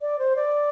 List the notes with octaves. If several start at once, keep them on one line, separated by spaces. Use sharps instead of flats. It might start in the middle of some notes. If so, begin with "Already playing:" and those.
D5
C5
D5